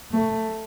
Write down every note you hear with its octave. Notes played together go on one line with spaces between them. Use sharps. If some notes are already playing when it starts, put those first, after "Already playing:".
A3